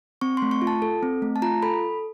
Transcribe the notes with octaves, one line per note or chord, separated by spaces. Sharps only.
C4 C#6
C6
A3
C#6
F4
A5
A4
C4
A3
A5
F4 A#5
A4 B5